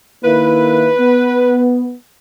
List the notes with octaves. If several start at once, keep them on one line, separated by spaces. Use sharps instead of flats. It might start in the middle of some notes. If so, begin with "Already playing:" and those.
D#3 A#3 E4 B4
B3